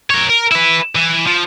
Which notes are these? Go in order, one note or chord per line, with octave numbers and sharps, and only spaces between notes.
A#4 C#5
A#4
E4 B4
E3
F3